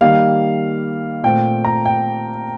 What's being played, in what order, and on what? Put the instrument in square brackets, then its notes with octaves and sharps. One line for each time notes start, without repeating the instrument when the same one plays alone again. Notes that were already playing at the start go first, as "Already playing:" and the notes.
[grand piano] D#3 G3 A#3 F5
A#2 A3 C4 G5
A#5
G5